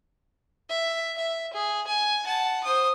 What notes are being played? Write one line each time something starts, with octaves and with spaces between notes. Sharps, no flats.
E5
E5
G#4
G#5
F#5 A5
C5 D#6